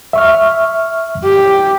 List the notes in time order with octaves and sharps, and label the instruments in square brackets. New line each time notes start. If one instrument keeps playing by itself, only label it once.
[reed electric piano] E5 C#6 F6
[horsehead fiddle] G4